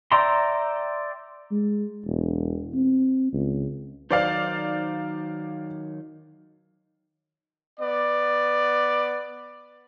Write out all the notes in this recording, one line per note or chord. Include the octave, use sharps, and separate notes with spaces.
D5 E5 G5 A#5 C6
G#3
E1
C4
C#2
D#3 F#3 D#4 C5 D5 F5
B3 D5